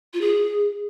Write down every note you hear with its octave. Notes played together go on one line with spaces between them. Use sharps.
F4
G#4